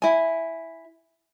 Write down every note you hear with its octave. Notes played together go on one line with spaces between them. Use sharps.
E4 G#5